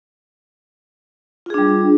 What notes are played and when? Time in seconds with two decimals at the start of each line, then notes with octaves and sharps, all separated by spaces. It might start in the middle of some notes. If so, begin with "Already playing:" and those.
1.46 F4
1.50 G#4
1.54 D4
1.58 G3